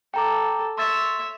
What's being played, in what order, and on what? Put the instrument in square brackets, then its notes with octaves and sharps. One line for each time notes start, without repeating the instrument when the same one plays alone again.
[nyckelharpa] A4 [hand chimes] G5 A#5 D6
[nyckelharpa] C#5 E5 [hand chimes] C6 E6 A6